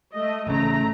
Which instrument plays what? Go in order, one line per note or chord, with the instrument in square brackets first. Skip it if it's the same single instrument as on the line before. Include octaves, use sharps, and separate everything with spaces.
[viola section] A3 D#5
[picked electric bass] A1 C#3 [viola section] A3 A#5